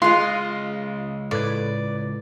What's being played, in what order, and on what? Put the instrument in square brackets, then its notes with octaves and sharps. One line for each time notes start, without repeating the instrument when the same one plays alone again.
[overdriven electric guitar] C#2 D#5 [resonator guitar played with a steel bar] G#3 F4 [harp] G#4 F#6 [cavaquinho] C6
[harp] A2 B4 G#6 [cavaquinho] D5